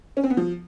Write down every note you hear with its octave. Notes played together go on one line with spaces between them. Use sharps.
C#4
C4
B3
F3